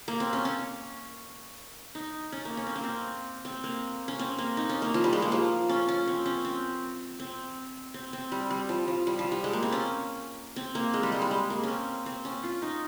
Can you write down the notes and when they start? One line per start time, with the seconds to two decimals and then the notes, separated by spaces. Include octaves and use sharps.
0.08 A#3
0.20 C4
0.33 C#4
0.45 C#4
1.95 D#4
2.32 C#4
2.45 A#3
2.57 C#4
2.67 C4
2.76 A#3
2.84 C4
3.45 C4
3.64 A#3
4.08 C#4
4.19 C4
4.38 A#3
4.57 D#4
4.69 C#4
4.82 A#3
4.94 F3
5.04 G3
5.13 G#3
5.22 A#3
5.32 F3
5.69 C#4
5.88 C#4
6.07 C4
6.26 C#4
6.45 C4
7.20 C4
7.94 C4
8.13 C4
8.32 G3
8.50 G3
8.69 F3
8.88 F3
9.07 G3
9.19 F3
9.32 G3
9.44 G#3
9.53 A#3
9.63 C4
9.72 C#4
10.56 C4
10.75 A#3
10.94 G#3
11.03 G3
11.12 G#3
11.22 G3
11.31 G#3
11.50 A#3
11.63 C#4
11.69 C4
12.06 C4
12.25 C#4
12.44 F4
12.62 D#4